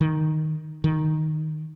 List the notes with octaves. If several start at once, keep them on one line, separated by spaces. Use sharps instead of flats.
D#3
D#3